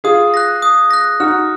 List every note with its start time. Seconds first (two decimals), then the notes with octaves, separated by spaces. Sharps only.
0.04 F4 G#4 D#6
0.34 F#6 A#6
0.62 D#6
0.91 F#6 A#6
1.20 D#4 F#4 F6